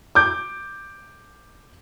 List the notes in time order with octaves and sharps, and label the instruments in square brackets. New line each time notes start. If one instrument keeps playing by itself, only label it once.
[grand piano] D6 G6